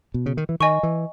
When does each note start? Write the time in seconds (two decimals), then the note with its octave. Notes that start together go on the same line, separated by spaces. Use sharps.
0.14 B2
0.26 C#3
0.37 D#3
0.49 E3
0.60 D#3 D#5 G#5 C#6
0.83 E3